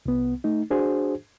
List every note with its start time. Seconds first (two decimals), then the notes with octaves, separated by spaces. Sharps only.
0.06 C2 B3
0.44 A3 D#4
0.71 D4 F#4 G#4 C5